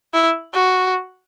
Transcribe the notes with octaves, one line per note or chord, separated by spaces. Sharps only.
E4
F#4